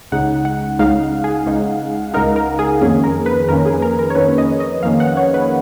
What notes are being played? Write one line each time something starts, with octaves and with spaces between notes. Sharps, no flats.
C#2 C#3 G#3 D#4 F#5
F#5
C#2 C#3 G#3 D#4 F5
G#4
C#2 C#3 G#3 D#4
C#2 C#3 G#3 D#4 A#4
A#4
G#4
F2 D#3 A#3 C#4 G#4
A#4
B4
F2 D#3 A#3 C#4 A#4
G#4
A#4
A#4
C#5
F2 D#3 A#3 C#4 B4
D#5
D#5
F2 D#3 A#3 C#4 F5
F#5
C#5
B4